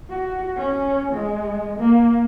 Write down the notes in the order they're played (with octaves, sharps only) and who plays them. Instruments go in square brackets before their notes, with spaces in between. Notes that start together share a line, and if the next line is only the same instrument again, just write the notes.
[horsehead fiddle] F#4
C#4
G#3
A#3